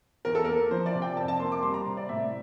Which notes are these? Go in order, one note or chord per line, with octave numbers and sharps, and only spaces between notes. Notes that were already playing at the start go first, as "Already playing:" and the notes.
E2 A#4
A4
A#3 A#4
F3 C5
D5
C3
G5
F2 A5
A5
A#3 C6
D6
G3 C6
A#5
C3
D5
A2 E5